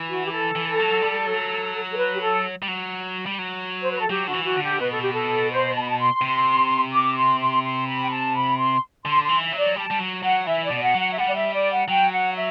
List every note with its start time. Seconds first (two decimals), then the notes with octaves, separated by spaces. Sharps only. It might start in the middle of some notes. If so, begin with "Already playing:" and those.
Already playing: E3
0.08 F#4
0.26 G4
0.31 A4
0.56 E3
0.79 F#3
1.02 G3
1.27 F#3
1.91 A4
1.97 B4
2.13 G4
2.21 A4
2.62 G3
2.68 F#3
3.26 G3
3.39 F#3
3.82 C5
3.91 B4
4.00 A4
4.10 F#3 G4
4.28 D3 F#4
4.33 E3
4.44 F#4
4.57 D3
4.62 G4
4.80 B2 B4
4.91 A4
5.02 G4
5.13 A4
5.51 C5
5.74 A5
5.82 B5
5.89 A5
5.98 C6
6.21 C3
6.92 D6
7.17 C6
7.40 C6
7.63 C6
7.88 B5
8.01 G5
8.10 A5
8.35 B5
8.58 C6
9.05 D3 C6
9.23 C6
9.29 E3
9.41 E5
9.52 F#3
9.58 D5
9.76 G3 A5
9.91 G3
9.99 F#3
10.23 F#3 F#5
10.46 E3 E5
10.65 D5
10.71 B2
10.83 F#5
10.94 F#3
11.00 F#5
11.13 E5
11.18 G3 F#5
11.27 D5
11.35 E5
11.53 D5
11.71 F#5
11.88 F#3 G5
12.12 F#5
12.36 E5